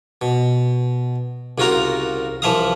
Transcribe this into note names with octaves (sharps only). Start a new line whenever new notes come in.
B2
C2 C#3 F4 F#4 A#4 A#5
C2 E3 F3 E5 F5 D#6